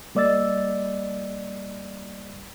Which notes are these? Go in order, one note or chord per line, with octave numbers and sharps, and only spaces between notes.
G3 A#3 D5 D#5 E6 A6